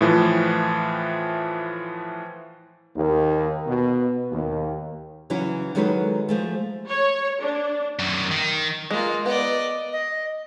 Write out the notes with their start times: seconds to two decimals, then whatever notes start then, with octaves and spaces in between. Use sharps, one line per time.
0.01 A2 E3 F3
2.96 D#2
3.66 B2
4.31 D#2
5.30 C#3 E3 F#3 C#4 E4
5.75 D#3 F#3 G#3 F#4 A4 B4
6.29 F3 G#3 A3
6.88 C#5
7.42 D4
7.99 F#2 D#3
8.31 D#3 D#4
8.91 G#3 A#3 F4
9.26 B3 D5 D#5
9.93 D#5